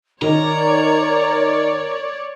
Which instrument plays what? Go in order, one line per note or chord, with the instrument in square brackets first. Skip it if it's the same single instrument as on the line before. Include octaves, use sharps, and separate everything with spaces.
[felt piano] D#3 [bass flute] A#4 [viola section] C#5 D5 [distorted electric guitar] A#5